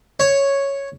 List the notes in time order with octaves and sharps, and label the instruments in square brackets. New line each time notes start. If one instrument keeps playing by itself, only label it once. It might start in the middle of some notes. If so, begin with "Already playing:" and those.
[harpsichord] C#5